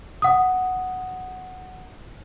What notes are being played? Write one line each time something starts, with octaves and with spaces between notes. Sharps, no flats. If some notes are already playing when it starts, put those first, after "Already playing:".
F#5 D#6